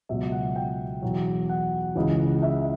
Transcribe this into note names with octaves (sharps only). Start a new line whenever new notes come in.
C#2 B2 F#3 E5
F#5
G5
E2 B2 F#3
F#5
C#2 C#3 E3
E5